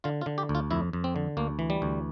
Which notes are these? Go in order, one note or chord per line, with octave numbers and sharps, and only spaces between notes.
D3 F4
F4
D3
G4
D2
F4
F2 E4
F2
C4
D3
D2 A#3
E3
G3
D2